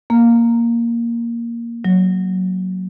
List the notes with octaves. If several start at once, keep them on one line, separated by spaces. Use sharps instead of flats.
A#3
F#3